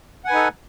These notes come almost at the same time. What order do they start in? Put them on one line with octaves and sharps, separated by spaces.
F#5 G#5 B4 D#4 A4